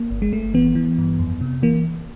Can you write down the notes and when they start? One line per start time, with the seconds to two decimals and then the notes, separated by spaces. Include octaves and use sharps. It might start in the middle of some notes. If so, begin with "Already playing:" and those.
Already playing: A#3
0.10 G1
0.22 G#3
0.32 G1 A3
0.54 E3 B3
0.75 E3
0.98 G2
1.19 F2
1.41 C3
1.63 E3 A#3